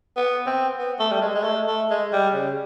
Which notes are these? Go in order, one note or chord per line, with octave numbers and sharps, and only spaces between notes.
B3
C4
B3
A3
G3
G#3
G#3
A3
A3
G#3
G3
C#3